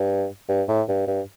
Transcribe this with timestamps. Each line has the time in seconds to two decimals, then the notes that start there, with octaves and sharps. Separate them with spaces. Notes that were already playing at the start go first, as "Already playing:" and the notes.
Already playing: G2
0.49 G2
0.68 A2
0.88 G2
1.07 G2